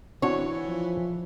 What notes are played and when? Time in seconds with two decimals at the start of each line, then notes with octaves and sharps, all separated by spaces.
0.22 E3 C4 D4 F#4 C#5
0.68 F3